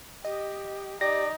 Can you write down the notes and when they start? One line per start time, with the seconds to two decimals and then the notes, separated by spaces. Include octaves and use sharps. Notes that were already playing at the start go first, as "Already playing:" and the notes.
0.25 G4 D#5
1.01 D#4 G4 D5 A#6